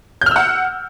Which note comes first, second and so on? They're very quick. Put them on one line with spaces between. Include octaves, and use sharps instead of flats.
G6 F6 E6 F#5